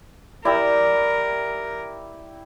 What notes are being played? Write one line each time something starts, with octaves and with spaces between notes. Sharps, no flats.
E4 G4 A#4 D5 E6